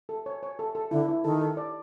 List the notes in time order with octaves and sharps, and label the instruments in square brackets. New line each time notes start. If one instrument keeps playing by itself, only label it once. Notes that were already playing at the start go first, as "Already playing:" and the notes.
[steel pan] A4
C#5
C#5
A4
A4
[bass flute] D3 [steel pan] E4
[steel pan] E4
[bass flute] D#3 [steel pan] A4
[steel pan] A4
D5